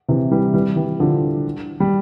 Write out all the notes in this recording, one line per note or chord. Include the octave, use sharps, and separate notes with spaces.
C3 E3
E3 G3
E3 G3
E3 G3
D3 F3
G3